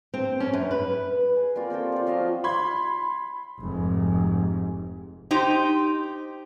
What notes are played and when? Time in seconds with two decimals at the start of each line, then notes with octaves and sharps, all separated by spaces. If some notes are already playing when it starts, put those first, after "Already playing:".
0.14 C4
0.40 C#4
0.53 F#2
0.71 B4
1.36 G#4
1.55 G3 A#3 C4 F4
1.70 C4 A4 C#5 G5
1.92 F4 D5
2.07 F3 F#3 D#5 F5
2.44 B5 C6 G#6
3.59 F1 G#2
5.31 D#4 G4 C5